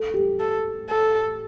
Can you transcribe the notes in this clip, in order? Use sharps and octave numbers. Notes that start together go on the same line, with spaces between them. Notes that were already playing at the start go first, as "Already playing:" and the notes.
Already playing: A4
G4
A4
A4